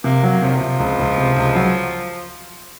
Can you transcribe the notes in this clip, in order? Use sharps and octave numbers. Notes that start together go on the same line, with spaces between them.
C3 A#3
F#3
C3 F3
D#3
C3 F3
C#2
C#2
C3
C#2
F#3